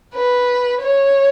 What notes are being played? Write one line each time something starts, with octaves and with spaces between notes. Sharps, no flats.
B4
C#5